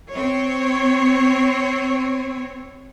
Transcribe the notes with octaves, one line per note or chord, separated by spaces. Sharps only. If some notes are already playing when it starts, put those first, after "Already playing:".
C4 C#5